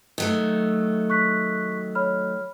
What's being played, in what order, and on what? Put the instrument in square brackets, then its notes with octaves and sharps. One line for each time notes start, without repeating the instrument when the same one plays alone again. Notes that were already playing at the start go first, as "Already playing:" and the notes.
[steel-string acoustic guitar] D#3 F#3 A3
[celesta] C#6 F#6 B6
C#5 B5 F6